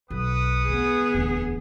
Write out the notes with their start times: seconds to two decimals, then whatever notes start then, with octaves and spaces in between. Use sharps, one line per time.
0.10 B1 B4 F#5 D#6
0.68 D2 B3 G#4
1.14 D1 E2